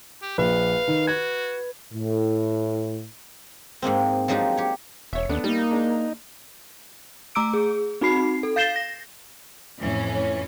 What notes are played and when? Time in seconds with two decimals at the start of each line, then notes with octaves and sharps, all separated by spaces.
0.22 G4
0.38 A#1 B4 F5
0.88 D#3
1.07 F#4 G#6
1.93 A2
3.82 G#2 G#3 A#3 C4
4.28 F3 F#3 G#3 D4 D#4 G4
4.57 G4 C#5
5.13 E1 C#5 E5
5.29 D#2 A3 B3 D4
5.44 G3 A#3 D#4
5.71 G#3 D4
7.35 A3 A#5 D6 E6 D7
7.54 G#4
8.01 C4 D#4 F#4 B5 C7
8.43 A4
8.56 F5 G6 A6 C7 E7 G7
8.76 A#6
9.79 F2 A2 E3 C#4